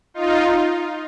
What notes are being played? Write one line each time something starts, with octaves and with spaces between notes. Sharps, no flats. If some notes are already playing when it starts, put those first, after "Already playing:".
D#4 F4